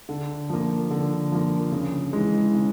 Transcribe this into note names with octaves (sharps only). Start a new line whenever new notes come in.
D3
F3 A#3
D3
F3 A#3
C#3
E3 G#3
C#3